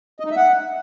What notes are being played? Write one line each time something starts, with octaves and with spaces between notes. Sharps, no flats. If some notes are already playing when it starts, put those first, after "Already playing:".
D#5
D#4
E5
F#5